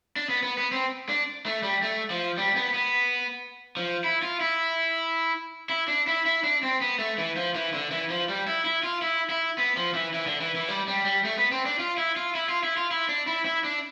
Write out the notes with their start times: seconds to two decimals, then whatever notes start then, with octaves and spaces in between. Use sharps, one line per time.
0.16 D4
0.29 B3
0.43 B3
0.58 B3
0.72 C4
1.09 D4
1.46 A3
1.63 G3
1.83 A3
2.10 F3
2.38 G3
2.56 B3
2.74 B3
3.77 F3
4.04 E4
4.22 F4
4.41 E4
5.69 E4
5.88 D4
6.07 E4
6.26 E4
6.44 D4
6.63 C4
6.81 B3
6.99 A3
7.18 E3
7.37 F3
7.55 E3
7.74 D3
7.91 E3
8.10 F3
8.29 G3
8.47 E4
8.65 E4
8.83 F4
9.02 E4
9.30 E4
9.58 B3
9.77 F3
9.94 E3
10.14 E3
10.27 D3
10.41 E3
10.55 E3
10.68 G3
10.88 G3
11.05 G3
11.25 A3
11.38 B3
11.52 C4
11.66 D4
11.79 F4
11.98 E4
12.16 F4
12.35 E4
12.49 F4
12.63 E4
12.77 F4
12.91 E4
13.09 D4
13.27 E4
13.45 E4
13.64 D4